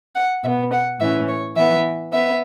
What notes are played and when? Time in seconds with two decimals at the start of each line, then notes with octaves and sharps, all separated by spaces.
0.15 F#5
0.44 B2 E5
0.48 B3
0.72 F#5
1.00 A2 E3 C#4 E5
1.28 C#5
1.56 E3 B3 E5
2.13 B3 E5